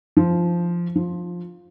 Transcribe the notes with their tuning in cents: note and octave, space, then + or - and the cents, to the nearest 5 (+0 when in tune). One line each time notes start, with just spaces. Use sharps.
F3 -10
F3 +10